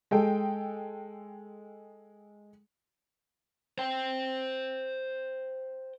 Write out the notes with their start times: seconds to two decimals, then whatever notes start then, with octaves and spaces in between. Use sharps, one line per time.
0.11 G#3 A4 G5
3.78 C5 G5